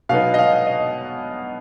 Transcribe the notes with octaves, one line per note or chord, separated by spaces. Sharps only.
B2 F#3 B3 D#4 F5
D#5
F5
D#5